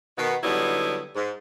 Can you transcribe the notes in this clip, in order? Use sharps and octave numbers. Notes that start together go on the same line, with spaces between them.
B2 D#3 B3
D3 F#3 G3 B3 D#4 E4
G#2